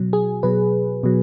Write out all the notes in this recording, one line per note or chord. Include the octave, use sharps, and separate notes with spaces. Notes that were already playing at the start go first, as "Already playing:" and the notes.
Already playing: B2 F#3
G#4
B2 F#3 B4
B2 F#3